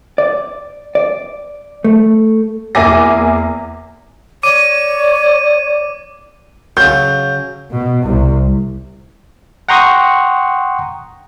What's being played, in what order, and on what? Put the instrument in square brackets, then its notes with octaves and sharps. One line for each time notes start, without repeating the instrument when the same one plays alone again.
[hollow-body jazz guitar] D5
D5
A3
[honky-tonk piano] E2 A#3 E5 G#5 D6 A#6
[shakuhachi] C#5 [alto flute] D5 [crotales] D6 D#7
[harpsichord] C#3 F#3 [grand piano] G6
[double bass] B2
C2 C3
[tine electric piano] F#5 G5 A#5 C6 C#6 D#6